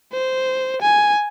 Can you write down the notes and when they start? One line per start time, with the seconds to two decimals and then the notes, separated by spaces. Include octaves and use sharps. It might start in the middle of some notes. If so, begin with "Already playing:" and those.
0.13 C5
0.82 G#5